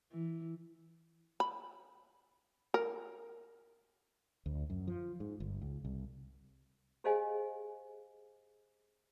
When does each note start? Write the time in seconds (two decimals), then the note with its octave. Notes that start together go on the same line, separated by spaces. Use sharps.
0.12 E3
1.40 B5
2.74 A#4
4.46 D2
4.70 F#2
4.87 F3
5.20 G#2
5.40 G1
5.62 C#2
5.85 C2
7.04 G4 G#4 C5 D#5 F5 G#5